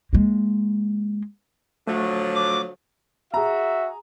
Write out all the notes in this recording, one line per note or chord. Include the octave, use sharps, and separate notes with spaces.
G#3 A#3
D3 F3 F#3 A3
D6
F#4 G#4 E5 A#5